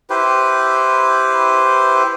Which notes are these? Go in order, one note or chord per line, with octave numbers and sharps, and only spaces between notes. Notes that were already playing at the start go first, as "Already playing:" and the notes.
E4 G4 B4 C5